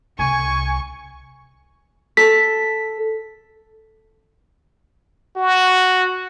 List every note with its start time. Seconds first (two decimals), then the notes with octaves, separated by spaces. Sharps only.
0.19 C2 G#5 C#6
2.17 A4 B6
5.36 F#4